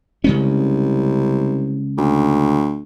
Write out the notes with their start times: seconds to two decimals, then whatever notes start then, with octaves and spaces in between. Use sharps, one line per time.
0.24 C2 C#3 G#3 C#4
1.98 D2